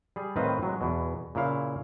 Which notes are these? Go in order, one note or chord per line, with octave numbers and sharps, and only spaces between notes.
G3 G#4
A2 D#3 C4 B4 D#5 F5
F#3 G#3
E2 B2
A#2 C#3 E4 F5